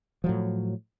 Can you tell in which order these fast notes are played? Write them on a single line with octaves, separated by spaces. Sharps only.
F3 F#3 A2